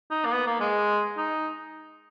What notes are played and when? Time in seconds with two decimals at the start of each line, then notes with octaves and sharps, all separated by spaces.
0.11 D#4
0.25 A#3
0.32 B3
0.47 A#3
0.60 G#3
1.17 D#4